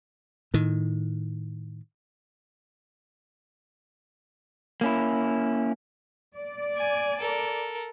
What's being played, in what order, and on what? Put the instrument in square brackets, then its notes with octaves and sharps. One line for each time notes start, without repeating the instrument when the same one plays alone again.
[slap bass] A2 D#3
[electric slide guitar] A#3 C#4 E4
[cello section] D5
[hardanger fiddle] G#5
A4 A#4